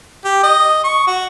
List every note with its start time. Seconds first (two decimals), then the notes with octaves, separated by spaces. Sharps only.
0.25 G4
0.43 D#5
0.84 C#6
1.07 F#4